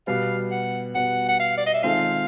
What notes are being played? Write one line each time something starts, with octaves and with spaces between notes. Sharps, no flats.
B2 G3 B3 F5
F#5
B2 G3 B3 F#5
F#5
F5
D5
D#5
E5
D#3 G#3 C4 F4 A4 F5